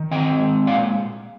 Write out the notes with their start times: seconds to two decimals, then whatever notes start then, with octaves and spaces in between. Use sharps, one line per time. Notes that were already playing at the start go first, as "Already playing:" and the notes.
Already playing: D#3
0.11 C4 D#5 G5
0.39 G#3
0.67 A#2 D5 F5